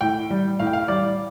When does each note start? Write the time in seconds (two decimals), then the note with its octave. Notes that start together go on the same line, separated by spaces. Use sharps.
0.01 A2 G5
0.30 G3
0.59 A2 F5
0.67 G5
0.73 F5
0.88 G3 D5